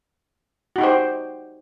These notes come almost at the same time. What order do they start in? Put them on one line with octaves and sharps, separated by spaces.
F#4 D#4 G4 C5